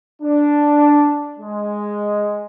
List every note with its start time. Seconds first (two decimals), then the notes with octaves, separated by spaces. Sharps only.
0.22 D4
1.39 G#3